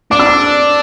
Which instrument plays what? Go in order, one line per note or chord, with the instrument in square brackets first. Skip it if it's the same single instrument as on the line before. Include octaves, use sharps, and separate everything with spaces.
[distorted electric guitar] D4 [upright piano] D6
[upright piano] E6
D6